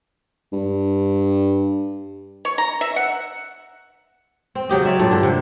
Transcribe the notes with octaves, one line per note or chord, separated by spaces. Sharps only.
G2
C#5
A#5
E5
F#5
C4
C#3 F#3 G4 D#5
C#5 D5 E5
G2 A#2 A4
D3
C3